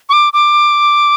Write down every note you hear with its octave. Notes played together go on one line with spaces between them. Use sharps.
C#6
D6
D6